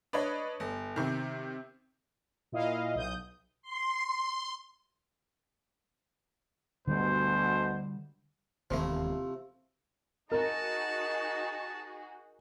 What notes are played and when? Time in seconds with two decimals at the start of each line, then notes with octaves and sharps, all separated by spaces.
0.13 D4 B4 C#5 D#5
0.60 G1
0.96 C3 D#3
2.52 A#2 E4 D#5 F5
2.95 B1 D#6 G6
3.62 C6
6.87 D2 B2 D3 G3 C5
8.71 E1 D#2 C3 F3 A3 E4 F4
10.32 D#4 F#4 G#4 A#4 D#5 A5